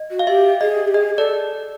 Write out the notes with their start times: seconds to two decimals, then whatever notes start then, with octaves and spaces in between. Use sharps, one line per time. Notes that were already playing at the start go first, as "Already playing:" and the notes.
Already playing: D#5
0.11 F#4
0.19 F5
0.27 G4 E5
0.61 G#4 D#5
0.88 G4
0.94 G#4 D#5
1.17 A4 D5